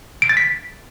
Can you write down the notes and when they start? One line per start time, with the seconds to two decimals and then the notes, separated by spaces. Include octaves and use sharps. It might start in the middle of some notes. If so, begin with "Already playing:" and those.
0.22 D7
0.29 A6
0.37 B6